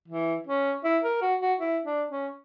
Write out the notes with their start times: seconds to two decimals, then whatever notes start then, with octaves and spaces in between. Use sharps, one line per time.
0.08 E3
0.47 C#4
0.84 E4
1.04 A#4
1.22 F#4
1.41 F#4
1.60 E4
1.85 D4
2.10 C#4